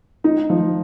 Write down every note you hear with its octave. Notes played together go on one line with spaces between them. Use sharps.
D#4
F3